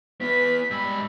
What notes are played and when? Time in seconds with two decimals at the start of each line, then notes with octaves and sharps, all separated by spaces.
0.21 B3 E4 B4 B6
0.71 G#2 G3 B5 E6